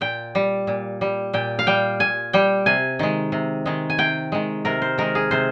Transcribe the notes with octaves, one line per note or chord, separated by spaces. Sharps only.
A#2 G5
G3
A#2
G3
A#2 G5
F5
G3 G5
A#2 G#5
G3 G5
C3 G#5
D#3 G#3
C3
D#3 G#3
G#5
C3 G5
D#3 G#3
C3 A#4
C5
D#3 G#3 A#4
G#4
C3 C5